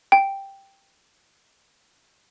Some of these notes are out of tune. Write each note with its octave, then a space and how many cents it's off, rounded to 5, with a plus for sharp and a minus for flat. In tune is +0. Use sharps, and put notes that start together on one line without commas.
G5 +0